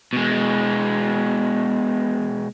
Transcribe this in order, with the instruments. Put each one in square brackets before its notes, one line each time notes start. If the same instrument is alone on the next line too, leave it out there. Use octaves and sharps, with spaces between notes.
[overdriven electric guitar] B2 G#3